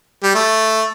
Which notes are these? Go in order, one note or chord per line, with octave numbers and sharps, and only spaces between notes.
G3
A3